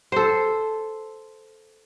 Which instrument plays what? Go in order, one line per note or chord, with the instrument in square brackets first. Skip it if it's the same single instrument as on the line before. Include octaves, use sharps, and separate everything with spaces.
[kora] A4 C5